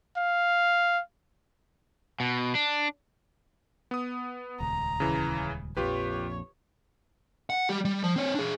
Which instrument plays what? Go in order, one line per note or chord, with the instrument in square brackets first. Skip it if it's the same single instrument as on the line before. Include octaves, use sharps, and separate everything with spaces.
[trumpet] F5
[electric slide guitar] B2
D4
[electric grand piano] B3 D#6
[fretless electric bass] D#1 C#2 [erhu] A#5
[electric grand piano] C#3 E3
[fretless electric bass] A#1 F2 [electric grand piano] F4 G4 B4 [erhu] C#5
[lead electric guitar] F#5
G3 G4
G3
F3
C4 C#5
D4 G#4